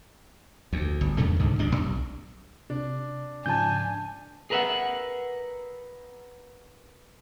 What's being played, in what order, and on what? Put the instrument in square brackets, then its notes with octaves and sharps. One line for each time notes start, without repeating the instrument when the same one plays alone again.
[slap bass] D2
G1
E2 G2 C#3 A3
C2 G#2 D3
D1 C#2 G3 D4
B1
[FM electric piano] C3 [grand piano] D4
[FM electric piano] G#2 C#3 F3 [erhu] G#5 [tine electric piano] A5 G6
[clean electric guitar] G#4 A#4 B4 D#5 E5 F#5